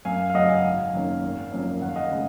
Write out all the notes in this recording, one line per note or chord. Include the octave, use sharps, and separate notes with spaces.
F#2 F5 G#5
F5
C#3 F#3 D#5 F#5
F5 G#5
G#1
F#2 D#3 A#3 C#4
G#1
F#2 F3 A#3 C#4
D#2 F#5
F5
D#5 F#5
C#3 G#3